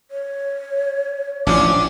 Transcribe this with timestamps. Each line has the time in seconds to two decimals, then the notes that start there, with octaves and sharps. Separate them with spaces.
0.11 C#5
1.47 A1 F3 C#4 D4 D6